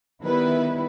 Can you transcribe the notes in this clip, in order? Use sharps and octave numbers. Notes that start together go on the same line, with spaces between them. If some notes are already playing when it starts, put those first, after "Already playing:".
D#3 G3 B3 E4 B4